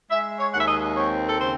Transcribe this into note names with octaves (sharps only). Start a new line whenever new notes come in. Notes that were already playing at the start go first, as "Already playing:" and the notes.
G#3 E5
C#5
D#2 F#5
E5
D#5
C4 C#5
A4
C#3 C5